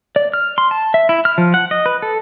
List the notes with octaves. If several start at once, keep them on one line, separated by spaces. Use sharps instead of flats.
D5
F6
C6
A5
E5
E4
F6
F3
F#5
D#5
B4
A4